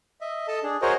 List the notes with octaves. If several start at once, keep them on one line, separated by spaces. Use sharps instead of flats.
D#5 E5
A4 D#5 A5
D4 G#4
F#4 G#4 A#4 C5 C#5 D#5